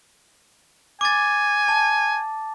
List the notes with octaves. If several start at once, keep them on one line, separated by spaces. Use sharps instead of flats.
G#5 D6 A6
A5